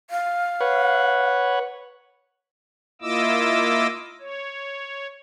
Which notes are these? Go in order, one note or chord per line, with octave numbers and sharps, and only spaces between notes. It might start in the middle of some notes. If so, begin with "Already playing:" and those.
F5
B4 C#5 F#5
A#3 E4 F4 D#5 D6 E6
C#5